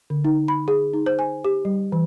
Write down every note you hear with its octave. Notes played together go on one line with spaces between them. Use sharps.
D3
D#4
B5
G#4
D#4
C5
G#5
G4
G3
E3